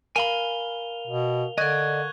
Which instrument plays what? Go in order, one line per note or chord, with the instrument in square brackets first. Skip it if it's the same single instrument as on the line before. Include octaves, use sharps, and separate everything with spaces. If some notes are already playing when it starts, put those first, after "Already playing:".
[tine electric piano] A#4 F5 [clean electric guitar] G#5 B5 [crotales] F7 G7
[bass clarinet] B2
[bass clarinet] D3 [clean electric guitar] D5 D#5 [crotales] C#6 F#6 G#6